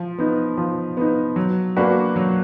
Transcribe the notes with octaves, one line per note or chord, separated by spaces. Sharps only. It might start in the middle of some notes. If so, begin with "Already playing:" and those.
Already playing: F3
B3 D#4
F3
B3 D#4
F#3
A#3 D4 F#4 B4
F#3